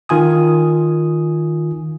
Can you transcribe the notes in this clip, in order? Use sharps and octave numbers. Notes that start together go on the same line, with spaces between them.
D#3 F4 G#5 D#6